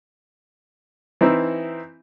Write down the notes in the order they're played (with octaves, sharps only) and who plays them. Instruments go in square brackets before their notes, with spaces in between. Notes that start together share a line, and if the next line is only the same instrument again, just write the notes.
[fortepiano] E3 C4 D#4 E4